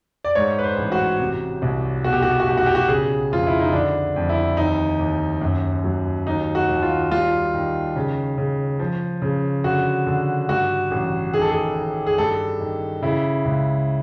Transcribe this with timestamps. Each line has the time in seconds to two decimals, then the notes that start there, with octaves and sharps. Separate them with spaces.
0.24 D5
0.35 G#2 C#5
0.59 B4
0.64 C5
0.77 A1
0.92 F#4
1.20 C3
1.62 C2
2.04 B2 F#4
2.13 G4
2.22 F#4
2.31 G4
2.40 F#4
2.47 B1 G4
2.57 F#4
2.66 G4
2.75 F#4
2.88 C#3 G#4
3.31 F2 F4
3.47 E4
3.60 D#4
3.73 D3 D4
4.16 F2
4.29 E4
4.57 D#2 D#4
4.99 D#2
5.42 F#2
5.84 F#3
6.26 D#2 D#4
6.55 F#4
6.69 D#2
6.82 F4
7.11 G3 F4
7.54 D#3
7.96 C#3
8.38 C#3
8.79 F3
9.22 C#3
9.64 D3 F#4
10.07 D3
10.49 G2 F#4
10.91 A1
11.33 D#3 G#4
11.42 A4
11.50 G#4
11.75 D#3
12.07 G#4
12.18 G2 A4
12.60 D#3
13.02 C#3 E4
13.45 C#2